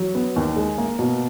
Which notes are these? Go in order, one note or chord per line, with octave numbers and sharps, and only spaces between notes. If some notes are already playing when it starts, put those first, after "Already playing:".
Already playing: F#3
B3
D#2
G#3
A#3
B2